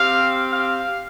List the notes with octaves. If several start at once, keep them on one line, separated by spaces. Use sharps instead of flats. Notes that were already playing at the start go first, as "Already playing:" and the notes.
Already playing: C4 G4 F5
F5